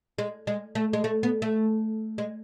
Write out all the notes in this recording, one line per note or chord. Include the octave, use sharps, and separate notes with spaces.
G#3
G#3
A3
G#3
A3
B3
A3
G#3